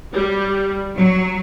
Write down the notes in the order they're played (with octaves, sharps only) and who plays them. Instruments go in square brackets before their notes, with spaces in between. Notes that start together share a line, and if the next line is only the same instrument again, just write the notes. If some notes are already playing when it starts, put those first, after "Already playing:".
[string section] G3
F#3